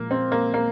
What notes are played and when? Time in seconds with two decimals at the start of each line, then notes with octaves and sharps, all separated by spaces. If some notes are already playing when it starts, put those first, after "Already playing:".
Already playing: A#2 F3 G#3 A#3
0.11 C4
0.32 A#3
0.54 A#3